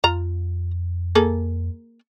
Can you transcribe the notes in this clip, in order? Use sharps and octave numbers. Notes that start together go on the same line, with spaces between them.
F2 F4 A#5
A#3 G#4 A4